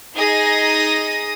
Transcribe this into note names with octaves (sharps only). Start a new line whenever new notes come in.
D#4 G#4 D#6 A#6